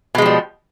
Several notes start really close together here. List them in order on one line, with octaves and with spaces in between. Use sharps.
B2 G#3 F3 G3